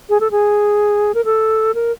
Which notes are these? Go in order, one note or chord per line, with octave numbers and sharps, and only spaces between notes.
G#4
A4
G#4
A#4
A4
A#4